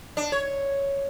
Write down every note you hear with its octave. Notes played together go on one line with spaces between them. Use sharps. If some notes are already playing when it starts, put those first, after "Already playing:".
D4
C#5